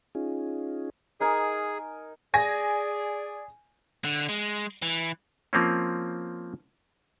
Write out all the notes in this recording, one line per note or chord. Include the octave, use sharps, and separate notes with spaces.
C#4 D#4 F4 G#4
D#4 G#4 A#4 G#5
G#4 D5 G#5 A#6
D3
G#3
E3
F3 A#3 C4 C#4